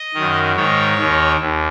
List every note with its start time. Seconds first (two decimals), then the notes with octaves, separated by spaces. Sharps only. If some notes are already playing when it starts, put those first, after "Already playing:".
Already playing: D#5
0.14 F#2 D#3
0.56 G#2 D#3 C#5
0.98 D#2 D#3
1.40 D#2